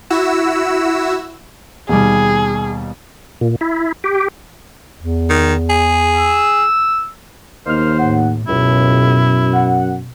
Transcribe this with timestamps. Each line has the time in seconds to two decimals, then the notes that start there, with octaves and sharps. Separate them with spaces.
0.10 E4 F#4 E6
1.89 D#2 B2 G3 G#4
3.41 A#2
3.61 E4
4.04 G4
4.98 E2
5.30 D#3
5.70 G#4
6.16 E6
7.66 D#2 A#3 D#4 C5 F6
7.98 A2 F#5
8.48 C#2 F#2 B2 E4
9.54 F#5